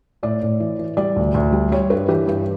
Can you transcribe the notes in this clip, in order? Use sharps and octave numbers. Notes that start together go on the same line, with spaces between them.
A2 D5
A2
E3
E3
G3 D5
D2
D2
G3
G3 C#5
G2 B4
E3 G4
G2